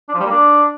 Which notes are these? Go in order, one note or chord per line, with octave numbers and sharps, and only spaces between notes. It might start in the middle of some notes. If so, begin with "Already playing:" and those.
D4
F3
G3
A#3
D4